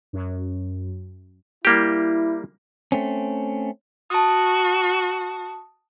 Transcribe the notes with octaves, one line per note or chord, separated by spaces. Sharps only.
F#2
G3 A#3 E4 G4
A3 C4 C#4
F#4 A5 D#6